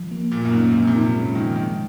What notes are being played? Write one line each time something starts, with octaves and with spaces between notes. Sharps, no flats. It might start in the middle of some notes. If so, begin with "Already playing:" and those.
Already playing: F3
A#3
A#2 A#3
F#2
G#2 A#3
A#2 F3
C3
A#2
D#4
C3
C#3 G#3
D#3 F3
D#3 G#3